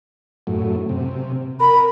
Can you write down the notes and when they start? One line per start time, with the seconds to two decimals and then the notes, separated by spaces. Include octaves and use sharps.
0.47 F#2 A2
0.89 C3
1.60 A#4 B5